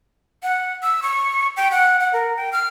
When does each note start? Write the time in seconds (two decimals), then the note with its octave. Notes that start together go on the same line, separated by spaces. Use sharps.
0.43 F#5
0.83 E6
1.03 C#6
1.57 G5
1.72 F#5
2.00 F#5
2.13 A#4
2.37 G5
2.52 F6